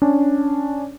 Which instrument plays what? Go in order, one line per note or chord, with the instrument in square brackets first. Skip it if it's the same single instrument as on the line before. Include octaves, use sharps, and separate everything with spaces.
[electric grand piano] C#4 D4